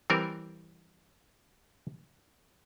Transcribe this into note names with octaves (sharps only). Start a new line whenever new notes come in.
E3 G3 C4 A#4